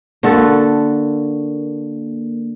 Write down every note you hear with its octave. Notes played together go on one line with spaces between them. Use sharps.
D3 A#3 F#4 A4